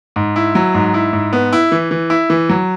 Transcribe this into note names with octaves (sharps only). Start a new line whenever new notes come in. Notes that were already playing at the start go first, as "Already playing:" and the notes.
G#2
E4
F#3
G#2
E4
G#2
B3
E4
E3
E3
E4
E3
F#3